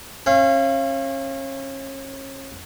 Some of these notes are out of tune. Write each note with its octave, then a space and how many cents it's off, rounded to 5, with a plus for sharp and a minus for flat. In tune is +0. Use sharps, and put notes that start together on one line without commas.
C#4 -35 F5 -30